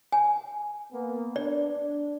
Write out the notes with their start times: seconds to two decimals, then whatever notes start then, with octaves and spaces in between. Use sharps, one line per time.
0.12 G#5
0.93 A#3 B3
1.36 D4 D5